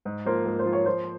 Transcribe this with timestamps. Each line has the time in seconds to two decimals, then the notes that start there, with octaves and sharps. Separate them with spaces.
0.05 G#2
0.25 F3 A#3 F4 C5
0.46 G#2 A#4
0.59 C5
0.65 F3 A#3 F4
0.73 C#5
0.86 F3 C5